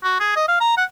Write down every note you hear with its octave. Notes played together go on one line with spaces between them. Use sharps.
F#4
G#4
D#5
F5
A#5
F#5